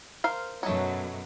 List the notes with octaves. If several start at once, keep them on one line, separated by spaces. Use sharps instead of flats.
A#4 C5 F5
F#2 B2 F#3 A3 D#4 C#5